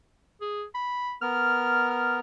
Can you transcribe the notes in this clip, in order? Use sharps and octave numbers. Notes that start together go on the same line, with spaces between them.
G#4
B5
B3 A#4 F6
F6